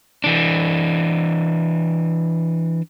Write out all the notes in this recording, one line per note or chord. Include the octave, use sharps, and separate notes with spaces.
E3 D4